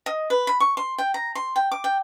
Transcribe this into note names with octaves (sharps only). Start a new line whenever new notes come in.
D#5
B4
B5
C#6
C6
G5
A#5
C6
G5
D6
G5